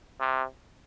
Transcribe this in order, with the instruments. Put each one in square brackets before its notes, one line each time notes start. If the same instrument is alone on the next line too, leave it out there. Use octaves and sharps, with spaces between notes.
[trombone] C3